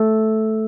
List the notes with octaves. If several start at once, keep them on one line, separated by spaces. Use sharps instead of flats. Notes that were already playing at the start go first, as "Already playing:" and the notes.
Already playing: A3